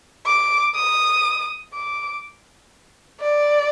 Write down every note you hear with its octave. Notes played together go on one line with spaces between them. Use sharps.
D6
D#6
D6
D5